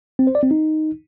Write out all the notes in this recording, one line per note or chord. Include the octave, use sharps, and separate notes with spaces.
C4
C5
D5
C4
D#4